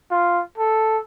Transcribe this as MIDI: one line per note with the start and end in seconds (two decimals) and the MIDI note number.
0.11 0.41 65
0.58 0.99 69